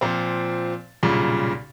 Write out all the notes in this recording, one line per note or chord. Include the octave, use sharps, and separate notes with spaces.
A#2 F3 C4
B1 G2 A#2 C#3